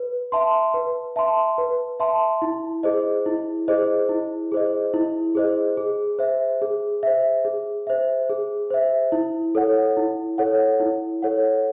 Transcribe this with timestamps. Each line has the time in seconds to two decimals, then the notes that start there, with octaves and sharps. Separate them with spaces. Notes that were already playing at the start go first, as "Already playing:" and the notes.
Already playing: B4
0.32 E5 A5 C6
0.74 B4
1.16 E5 A5 C6
1.58 B4
2.00 E5 A5 C6
2.42 E4
2.83 G#4 C5 D#5
3.26 E4
3.68 G#4 C5 D#5
4.09 E4
4.52 G#4 C5 D#5
4.94 E4
5.35 G#4 C5 D#5
5.77 G#4
6.19 C5 E5
6.62 G#4
7.03 C5 E5
7.45 G#4
7.87 C5 E5
8.29 G#4
8.71 C5 E5
9.12 E4
9.55 A4 C#5 F#5
9.97 E4
10.38 A4 C#5 F#5
10.80 E4
11.22 A4 C#5 F#5